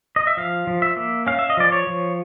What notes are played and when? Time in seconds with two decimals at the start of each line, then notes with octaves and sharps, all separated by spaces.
0.16 D#5
0.27 E5
0.37 F3 F5
0.67 F3
0.82 E5
0.97 A#3
1.27 C#4 F5
1.39 E5
1.50 D#5
1.57 F3 D5
1.72 C#5
1.87 F3